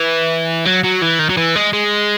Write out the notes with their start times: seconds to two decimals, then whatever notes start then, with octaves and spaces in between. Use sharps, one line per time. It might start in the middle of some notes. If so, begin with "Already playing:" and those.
Already playing: E3
0.65 F#3
0.83 F#3
1.01 E3
1.19 D#3
1.29 F#3
1.37 E3
1.56 G#3
1.73 G#3